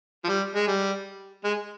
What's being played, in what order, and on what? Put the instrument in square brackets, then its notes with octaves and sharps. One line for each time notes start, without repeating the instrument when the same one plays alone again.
[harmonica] F3
G3
G#3
G3
G#3